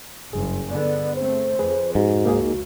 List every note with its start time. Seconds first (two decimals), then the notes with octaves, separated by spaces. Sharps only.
0.33 F#1 G2 G#4
0.71 D3 B3 D5
1.15 A3 C4 C5
1.59 F2 G#4 B4
1.95 G#2 F#4
2.25 C#2 A#3 D#4 G#4